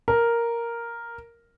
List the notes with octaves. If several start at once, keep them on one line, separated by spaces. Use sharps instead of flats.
A#4